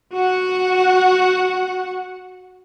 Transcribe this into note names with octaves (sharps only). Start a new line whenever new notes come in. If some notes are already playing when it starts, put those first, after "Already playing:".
F#4 F#5